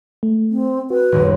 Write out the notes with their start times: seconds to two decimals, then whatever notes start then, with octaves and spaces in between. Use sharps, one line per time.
0.23 A3
0.50 C4
0.90 F#4 B4
1.12 D#1 C#2 F#2